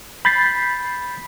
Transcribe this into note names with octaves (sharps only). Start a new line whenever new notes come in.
B5 G6 A6 B6 C7